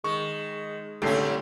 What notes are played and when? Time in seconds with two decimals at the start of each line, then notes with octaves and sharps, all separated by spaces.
0.04 D#3 G#3 C#6
1.02 C2 A2 D3 A3 C#4 G4 C7